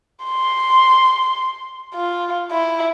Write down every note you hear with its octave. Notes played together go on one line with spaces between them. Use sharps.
C6
F4
E4